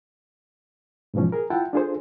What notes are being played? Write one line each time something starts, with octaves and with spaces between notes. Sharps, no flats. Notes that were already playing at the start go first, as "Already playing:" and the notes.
G#2 B2 E3 F3 C#4
G#4 A#4
E4 F4 F#5 G5 A5
D4 F4 G#4 A4 C5